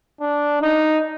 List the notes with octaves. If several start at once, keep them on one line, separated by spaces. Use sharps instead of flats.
D4
D#4